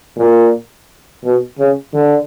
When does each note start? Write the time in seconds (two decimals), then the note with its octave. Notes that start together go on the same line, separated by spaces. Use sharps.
0.17 A#2
1.24 B2
1.59 C#3
1.94 D3